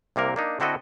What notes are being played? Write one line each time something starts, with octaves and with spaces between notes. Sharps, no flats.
C2 C3 A#3 A#4
A#3 D4 D#4
D3 C4 E4 F#4 A4 D#5